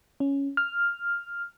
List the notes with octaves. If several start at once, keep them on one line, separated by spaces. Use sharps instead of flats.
C#4
F6